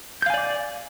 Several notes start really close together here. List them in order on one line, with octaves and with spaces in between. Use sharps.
G6 F5 G#5 D5 D6